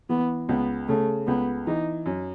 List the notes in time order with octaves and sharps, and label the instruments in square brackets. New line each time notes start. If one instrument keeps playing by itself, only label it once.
[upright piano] E3 [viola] B3
[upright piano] C#2 [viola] B3
[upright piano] C#3 [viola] A3
[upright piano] C#2 [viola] B3
[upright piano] E3 [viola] D#4
[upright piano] F#2